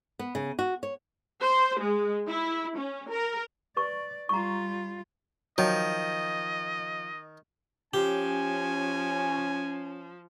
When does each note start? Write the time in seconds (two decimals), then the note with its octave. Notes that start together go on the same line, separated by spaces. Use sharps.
0.19 B3
0.35 C#3
0.59 F#4
0.83 C#5
1.41 C5
1.80 G#3
2.28 E4
2.78 C#4
3.11 A#4
3.77 B4 D5 C#6
4.29 G3 F4 A#5 C#6
5.58 D#3 F3 F#3 D#5
7.94 F3 C#4 G4 G#5